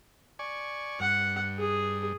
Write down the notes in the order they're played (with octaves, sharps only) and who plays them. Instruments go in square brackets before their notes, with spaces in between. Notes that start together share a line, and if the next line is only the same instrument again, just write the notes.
[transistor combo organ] D5 G#5 C#6
[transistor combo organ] G2 [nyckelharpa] F#5
[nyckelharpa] G#4